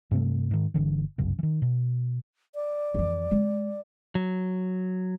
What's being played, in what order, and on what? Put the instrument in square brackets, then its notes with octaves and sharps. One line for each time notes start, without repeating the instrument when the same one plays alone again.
[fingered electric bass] G2 C3 A3
G#2 D#3
G1 D3 E3
G1 C2 F#2 C#3
D#3 E3
B2
[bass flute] D5
[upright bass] F2 E3
G#3 C4
[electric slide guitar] F#3